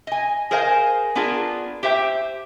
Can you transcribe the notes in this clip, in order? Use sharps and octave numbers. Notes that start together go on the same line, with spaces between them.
D#5 G#5
G#4 A#4 C5 D#5 F5 G#5
B3 D4 F4 G#4 A#4
G4 C5 E5 G5